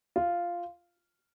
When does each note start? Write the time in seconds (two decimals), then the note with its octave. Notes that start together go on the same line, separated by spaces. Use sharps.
0.16 F4